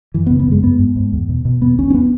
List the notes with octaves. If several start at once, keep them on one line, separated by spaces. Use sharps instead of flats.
F#2 E3
C#3 B3
B3
F#2 G#3
G#2 B3
G#2
G#2
E2
B2
B2
E2 B3
E2 C#4
C#4
B3